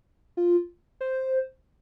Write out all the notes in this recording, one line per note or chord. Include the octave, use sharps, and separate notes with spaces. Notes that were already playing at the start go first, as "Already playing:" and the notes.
F4
C5